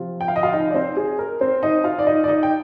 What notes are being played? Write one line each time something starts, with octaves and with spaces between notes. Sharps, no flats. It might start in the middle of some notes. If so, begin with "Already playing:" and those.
Already playing: C3 F3 C4 F4
G5
F5
D#5
F4 F5
D#4 D#5
D5
C4 C5
G#4
A#4
C4 C5
D#4 D#5
F4 F5
D5
D#4 D#5
D5
D#4 D#5
G5